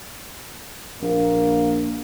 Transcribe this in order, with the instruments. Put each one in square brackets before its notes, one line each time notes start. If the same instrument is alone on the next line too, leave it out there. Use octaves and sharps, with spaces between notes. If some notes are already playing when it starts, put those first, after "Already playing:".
[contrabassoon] A#1 [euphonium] A#3